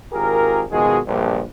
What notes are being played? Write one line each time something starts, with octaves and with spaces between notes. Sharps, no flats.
G#1 F4 G4 G#4 A#4
B2 D#3 F3 G#3 F#4 G#4
A#1 G2